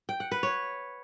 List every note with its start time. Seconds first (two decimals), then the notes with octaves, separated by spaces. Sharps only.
0.09 G5
0.20 F#5
0.32 B4
0.43 C#5